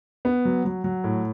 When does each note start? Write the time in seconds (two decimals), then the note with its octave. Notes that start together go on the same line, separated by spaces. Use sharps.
0.25 B3
0.45 F#3
0.65 F#3
0.84 F#3
1.04 A2